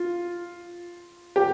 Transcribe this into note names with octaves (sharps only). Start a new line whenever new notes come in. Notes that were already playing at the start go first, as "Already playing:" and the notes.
Already playing: F4
G4